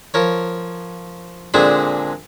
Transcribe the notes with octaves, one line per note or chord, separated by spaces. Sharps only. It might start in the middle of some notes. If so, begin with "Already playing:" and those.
F3 A#4 C#5
A#2 D3 G#3 C4 D4 G#4